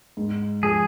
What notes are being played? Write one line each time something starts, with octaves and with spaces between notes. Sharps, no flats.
G#2
F3 G#3 G#4